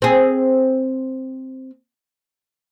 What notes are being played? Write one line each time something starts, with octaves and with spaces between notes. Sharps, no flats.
C4 G#4